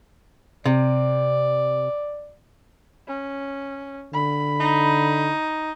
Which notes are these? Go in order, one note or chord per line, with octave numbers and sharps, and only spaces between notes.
C3 D5
C#4
D3 B5
D#4